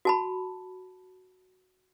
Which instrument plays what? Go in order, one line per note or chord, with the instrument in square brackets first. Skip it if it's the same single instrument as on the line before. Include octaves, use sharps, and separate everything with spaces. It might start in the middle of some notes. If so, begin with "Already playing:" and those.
[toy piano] F#4 A5 B5